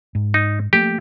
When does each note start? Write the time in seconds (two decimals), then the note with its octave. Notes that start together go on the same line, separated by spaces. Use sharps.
0.15 G#2
0.34 D#4
0.73 F3 A3 A#3 G4